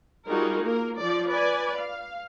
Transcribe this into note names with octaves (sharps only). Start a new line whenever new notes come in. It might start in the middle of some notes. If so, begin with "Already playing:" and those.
G3 D#4 F4 F#4 G#4 A#4
A#3 A#4
F3 D5
B4 D5 G#5
F5